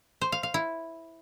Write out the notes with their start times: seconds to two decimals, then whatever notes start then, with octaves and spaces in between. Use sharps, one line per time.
0.21 C5
0.32 F5
0.43 F5
0.54 E4